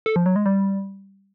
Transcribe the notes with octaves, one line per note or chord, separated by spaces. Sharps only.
A4
F3
F#3
G#3
G3